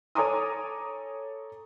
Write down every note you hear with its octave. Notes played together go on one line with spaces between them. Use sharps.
A4 C#5 G#5 A#5 D6 D#6